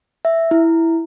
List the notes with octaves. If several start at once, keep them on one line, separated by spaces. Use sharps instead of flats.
E5
E4